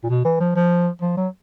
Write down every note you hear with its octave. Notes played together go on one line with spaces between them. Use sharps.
A#2
B2
E3
F3
F3
F3
F#3